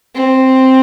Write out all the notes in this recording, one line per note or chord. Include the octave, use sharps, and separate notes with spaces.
C4